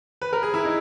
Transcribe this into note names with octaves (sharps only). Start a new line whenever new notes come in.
B4
A#4
G#4
E4
D#4